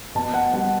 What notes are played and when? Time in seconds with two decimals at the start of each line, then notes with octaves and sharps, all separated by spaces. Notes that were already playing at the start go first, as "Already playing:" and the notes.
0.15 B2 A5
0.34 F#5
0.53 G3 F#5